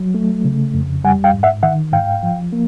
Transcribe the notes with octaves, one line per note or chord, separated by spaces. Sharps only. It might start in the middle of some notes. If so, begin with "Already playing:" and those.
Already playing: F#3
A3
C#3
F2
G3 F#5 G#5
F5 G5
G#2
E5 F#5
D#3 E5 F#5
G#2 F5 G5
F3
A#3